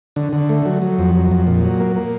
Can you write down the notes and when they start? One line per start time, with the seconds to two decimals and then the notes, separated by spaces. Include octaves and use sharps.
0.16 D3
0.33 D3
0.49 A3
0.66 F#3
0.82 F#3
0.98 F2
1.15 F#3
1.31 F2
1.47 A#2
1.64 F#3
1.80 A#3
1.96 A#3